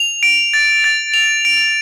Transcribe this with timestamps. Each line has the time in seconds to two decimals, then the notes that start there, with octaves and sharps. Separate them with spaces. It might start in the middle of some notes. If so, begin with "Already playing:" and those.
Already playing: F7
0.23 D7
0.54 A6
0.84 A6
1.14 F7
1.45 D7